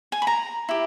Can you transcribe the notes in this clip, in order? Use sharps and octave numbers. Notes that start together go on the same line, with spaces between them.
G#5
B5
A#5
E4 G4